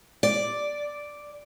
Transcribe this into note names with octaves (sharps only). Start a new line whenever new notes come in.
D5